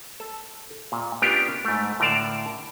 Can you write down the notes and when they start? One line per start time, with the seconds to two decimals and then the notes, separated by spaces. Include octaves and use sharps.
0.20 A4
0.92 A#2
1.22 B3 C#4 D4 F4 G4 A#4
1.65 G#2 A3
2.00 A2 D3 A#4 D5 F5 A5